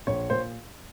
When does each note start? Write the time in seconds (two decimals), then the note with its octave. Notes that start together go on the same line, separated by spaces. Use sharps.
0.07 A#1 C#5
0.30 A#2 C5